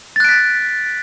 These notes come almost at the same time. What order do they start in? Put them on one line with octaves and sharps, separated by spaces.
A6 F#6 D7 B6